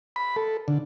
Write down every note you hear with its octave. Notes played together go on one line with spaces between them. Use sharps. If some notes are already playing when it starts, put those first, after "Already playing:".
B5
A4
D3